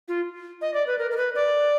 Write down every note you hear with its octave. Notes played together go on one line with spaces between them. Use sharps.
F4
D#5
D5
B4
A#4
A#4
B4
D5